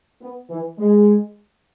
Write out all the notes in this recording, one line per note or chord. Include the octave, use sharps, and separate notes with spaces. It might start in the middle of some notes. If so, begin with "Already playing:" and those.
B3
E3
G#3